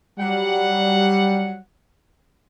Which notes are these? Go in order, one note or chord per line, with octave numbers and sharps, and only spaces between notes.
F#3 G3 F#5